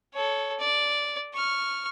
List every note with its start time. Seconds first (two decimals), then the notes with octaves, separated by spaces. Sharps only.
0.14 A4 C#5
0.60 D5
1.34 C#6 F6